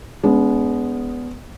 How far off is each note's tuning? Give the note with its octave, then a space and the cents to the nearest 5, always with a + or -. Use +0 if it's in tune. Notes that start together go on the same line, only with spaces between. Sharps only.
G#3 +0 B3 +0 D4 -45